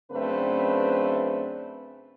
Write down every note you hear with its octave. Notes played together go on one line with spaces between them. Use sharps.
F#2 C#3 A3 C4 D4 B4